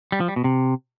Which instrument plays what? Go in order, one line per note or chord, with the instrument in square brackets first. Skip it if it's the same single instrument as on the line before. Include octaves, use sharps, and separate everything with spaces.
[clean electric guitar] G3
F3
G3
B2
C3